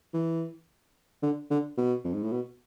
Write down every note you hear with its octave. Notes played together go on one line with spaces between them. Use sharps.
E3
D3
D3
B2
F2
G#2
A2
B2